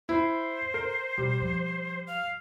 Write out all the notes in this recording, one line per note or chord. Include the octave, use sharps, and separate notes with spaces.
E4 C5
A#4
B2 G3
F3
F5